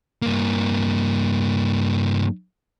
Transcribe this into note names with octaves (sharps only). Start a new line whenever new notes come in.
G2 A#3